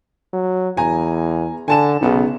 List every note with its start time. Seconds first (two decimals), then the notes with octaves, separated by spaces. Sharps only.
0.33 F#3
0.77 E2 G#5 A#5
1.68 D3 G#5 A5 E7
2.01 B1 C#3 B3 D#4